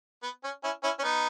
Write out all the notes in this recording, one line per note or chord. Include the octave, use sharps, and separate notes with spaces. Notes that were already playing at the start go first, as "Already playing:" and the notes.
B3
C#4
C#4 E4
C#4 E4
C#4
B3 D#4